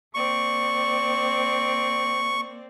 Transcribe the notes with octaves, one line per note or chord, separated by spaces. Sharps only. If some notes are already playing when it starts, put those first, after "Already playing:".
A#3 C4 D5 C#6